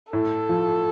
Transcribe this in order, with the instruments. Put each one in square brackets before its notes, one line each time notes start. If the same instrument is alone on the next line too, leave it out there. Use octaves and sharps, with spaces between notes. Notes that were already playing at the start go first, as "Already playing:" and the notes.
[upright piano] A2 [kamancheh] A4
[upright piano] F3